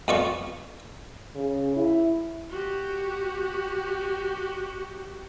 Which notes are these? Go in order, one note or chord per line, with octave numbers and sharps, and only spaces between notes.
F2 B3 F4 D5 C#6
C#3
E4
F#4 G4